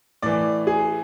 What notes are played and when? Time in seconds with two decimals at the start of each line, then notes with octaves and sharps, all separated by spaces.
0.22 A2 E3 D5
0.67 G#4